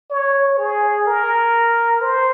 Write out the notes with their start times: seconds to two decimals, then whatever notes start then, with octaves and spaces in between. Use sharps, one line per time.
0.10 C#5
0.58 G#4
1.07 A#4
2.01 C5